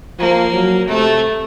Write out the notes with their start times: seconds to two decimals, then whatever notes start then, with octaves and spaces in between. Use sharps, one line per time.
0.19 F3 A#3
0.53 F#3
0.88 C3 A3